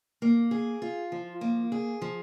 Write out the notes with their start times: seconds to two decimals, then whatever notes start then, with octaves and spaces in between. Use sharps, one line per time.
0.22 A#3
0.51 G#4
0.82 F4
1.12 F3
1.41 A#3
1.72 G#4
2.02 F3